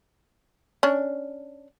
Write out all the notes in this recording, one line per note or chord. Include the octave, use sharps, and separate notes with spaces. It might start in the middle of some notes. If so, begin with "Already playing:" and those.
C#4 D4